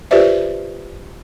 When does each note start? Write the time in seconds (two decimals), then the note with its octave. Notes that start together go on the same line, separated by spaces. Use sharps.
0.11 F4 G4 B4 C5 D5 E5